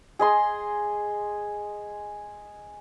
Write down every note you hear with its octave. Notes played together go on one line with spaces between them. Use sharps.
G#4 D#5 C6